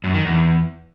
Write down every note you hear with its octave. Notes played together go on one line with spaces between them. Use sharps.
F#2
D#3
E2